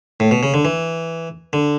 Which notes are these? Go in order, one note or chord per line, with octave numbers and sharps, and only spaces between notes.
A2
B2
C#3
D3
E3
D3